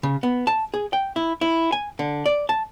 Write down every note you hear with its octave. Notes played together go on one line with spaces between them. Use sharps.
C#3
B3
A5
G#4
G5
E4
E4
G#5
D3
D5
A5